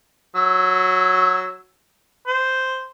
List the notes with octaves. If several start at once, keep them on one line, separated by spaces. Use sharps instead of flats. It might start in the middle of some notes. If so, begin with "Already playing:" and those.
F#3 E6
C5